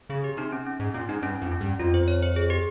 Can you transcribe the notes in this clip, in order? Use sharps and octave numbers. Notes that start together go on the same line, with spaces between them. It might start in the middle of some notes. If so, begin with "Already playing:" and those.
C#3 G#4
G4
C3 D#4
C#4
C#4
G#2
A#2 C#4
G#2 D#4
G2 C#4
F2
C#4
G2
F2 F4
C5
C#5
C5
G#4
G4